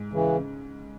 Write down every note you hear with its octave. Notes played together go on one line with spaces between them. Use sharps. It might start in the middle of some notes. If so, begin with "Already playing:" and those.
Already playing: G#2
C#3 E3
C#3